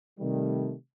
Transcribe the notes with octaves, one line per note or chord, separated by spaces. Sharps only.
C3 D#3 G3 A3